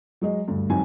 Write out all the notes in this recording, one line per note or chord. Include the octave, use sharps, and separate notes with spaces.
F#3 G#3 D#5
D2 G2
G#2 D#3 F#3 C4 G#5